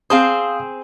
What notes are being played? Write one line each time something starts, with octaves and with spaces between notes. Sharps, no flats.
C4 G#4 C5 F5 D#6